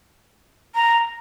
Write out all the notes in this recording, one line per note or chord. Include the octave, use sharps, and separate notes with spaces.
A#5